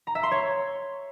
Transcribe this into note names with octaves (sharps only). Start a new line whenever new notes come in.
A#5
E5
C6
C#5